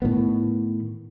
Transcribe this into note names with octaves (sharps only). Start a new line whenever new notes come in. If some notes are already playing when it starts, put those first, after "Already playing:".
A2 D#3 B3